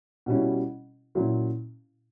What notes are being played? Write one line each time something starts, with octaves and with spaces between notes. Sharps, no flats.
B2 G3 C#4 E4
A#2 F#3 C#4 E4